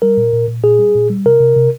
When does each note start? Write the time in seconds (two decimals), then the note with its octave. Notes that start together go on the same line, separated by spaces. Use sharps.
0.02 G3 A#4
0.18 A#2
0.33 A#2
0.48 A#2
0.63 A#2 G#4
0.79 G3
0.95 A#2
1.10 G3
1.26 C3 A#4
1.40 C3
1.56 C3